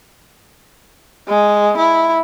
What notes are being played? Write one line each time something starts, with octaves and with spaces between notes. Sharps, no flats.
G#3
E4